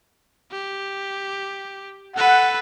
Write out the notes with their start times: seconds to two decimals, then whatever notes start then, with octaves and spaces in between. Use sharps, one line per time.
0.52 G4
2.16 A4 B4 F#5